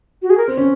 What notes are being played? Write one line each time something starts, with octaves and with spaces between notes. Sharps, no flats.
F#4
G#4
A#4
C4
C#4